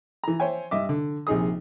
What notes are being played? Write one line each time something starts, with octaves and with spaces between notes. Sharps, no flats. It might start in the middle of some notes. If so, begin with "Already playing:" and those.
E3 A#5
C5 C#5 E5 G5 G#5
G2 D#5 E5 D6
D3
A#1 C3 D#4 G#4 D#6